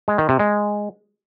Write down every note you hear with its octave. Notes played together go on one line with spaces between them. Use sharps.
G#3
D#3
C3
G#3